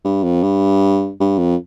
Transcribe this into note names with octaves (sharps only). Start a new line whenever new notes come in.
G2
F2
G2
G2
F2